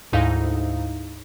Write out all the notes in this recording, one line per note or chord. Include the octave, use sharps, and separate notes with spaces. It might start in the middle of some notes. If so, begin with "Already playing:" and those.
D2 G#2 D#4 E4 F5